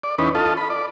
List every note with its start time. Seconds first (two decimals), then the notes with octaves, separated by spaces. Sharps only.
0.04 D5
0.18 E2 C#4 D#4 B4
0.35 F4 A4 D#5
0.57 B5
0.70 D5